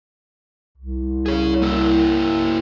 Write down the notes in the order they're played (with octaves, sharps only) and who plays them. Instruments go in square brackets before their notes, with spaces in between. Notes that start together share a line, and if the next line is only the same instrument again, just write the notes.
[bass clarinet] C2
[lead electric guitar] G#4 C#5
A#3 E4